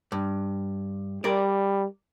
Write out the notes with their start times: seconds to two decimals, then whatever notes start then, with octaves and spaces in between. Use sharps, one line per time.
0.12 G2
1.24 G3 A#4 D5